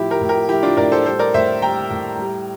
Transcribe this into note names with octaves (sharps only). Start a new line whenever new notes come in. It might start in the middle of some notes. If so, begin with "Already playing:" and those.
Already playing: A2 F3 E4 G4
G4 A#4
A2
G4 A#4
F3 E4 G4
D4 F4
A2 A#4 D5
A4 C5
G3 A4 C5
A#4 D5
A2 C5 E5
G3 G5 A#5
A2
G3